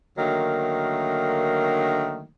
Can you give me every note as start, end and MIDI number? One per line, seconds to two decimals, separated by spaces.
0.18 2.27 50
0.18 2.27 51
0.18 2.27 54
0.18 2.27 57
0.18 2.27 58